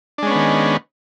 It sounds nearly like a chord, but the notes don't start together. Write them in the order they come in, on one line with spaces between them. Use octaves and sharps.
D4 G#3 C#4 B3 D#3